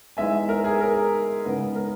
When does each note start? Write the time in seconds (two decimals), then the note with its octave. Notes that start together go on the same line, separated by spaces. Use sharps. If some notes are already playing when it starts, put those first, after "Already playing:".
0.17 E3 G#3 B3 D#4 E5 G#5
0.49 A#4
0.64 G#4
0.81 A#4
1.44 C#3 G#3 B3 D#4
1.76 A#4